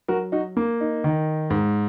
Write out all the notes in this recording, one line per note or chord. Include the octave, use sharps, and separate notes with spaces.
F#3 F#4 A#4
D#4 F#4
A#3
D#4
D#3
G#2